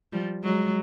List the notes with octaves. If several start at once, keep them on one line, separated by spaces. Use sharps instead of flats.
F3 G3
F#3 G#3